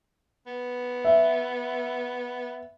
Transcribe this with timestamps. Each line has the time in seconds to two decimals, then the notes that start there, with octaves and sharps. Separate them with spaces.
0.47 B3
1.05 E5